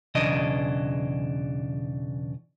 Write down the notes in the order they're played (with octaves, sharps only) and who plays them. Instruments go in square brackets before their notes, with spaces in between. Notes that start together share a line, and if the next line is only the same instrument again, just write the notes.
[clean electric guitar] B1 E2 C#3 E3 D4 D#5